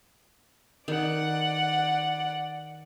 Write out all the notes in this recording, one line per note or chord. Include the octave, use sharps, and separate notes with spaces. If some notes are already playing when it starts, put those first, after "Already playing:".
D#3 D5 F#5